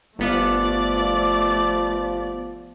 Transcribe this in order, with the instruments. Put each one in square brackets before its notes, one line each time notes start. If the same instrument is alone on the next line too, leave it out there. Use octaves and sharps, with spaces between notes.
[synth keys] G1 B3 F5 [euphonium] F3 [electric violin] A3 D5